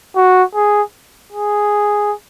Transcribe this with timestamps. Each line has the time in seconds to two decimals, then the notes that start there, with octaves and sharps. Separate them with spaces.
0.16 F#4
0.55 G#4
1.32 G#4